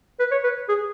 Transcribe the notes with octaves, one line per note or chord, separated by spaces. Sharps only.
B4
C#5
B4
G#4